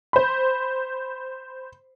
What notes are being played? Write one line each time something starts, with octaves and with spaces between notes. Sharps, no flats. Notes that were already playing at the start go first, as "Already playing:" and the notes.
C5 B5